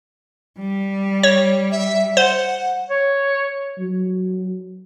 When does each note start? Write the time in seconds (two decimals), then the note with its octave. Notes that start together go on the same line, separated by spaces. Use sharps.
0.60 G3
1.23 C#5
1.72 E5
2.17 C5 F#5
2.90 C#5
3.79 F#3